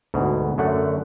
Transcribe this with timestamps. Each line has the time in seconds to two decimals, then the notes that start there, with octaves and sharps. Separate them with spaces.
0.14 D2 G#2 B2
0.58 F#2 D3 A3 F#5